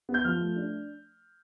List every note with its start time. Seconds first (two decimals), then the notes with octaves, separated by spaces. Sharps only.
0.09 B3
0.14 G6
0.24 F3 F6
0.40 A3
0.56 D4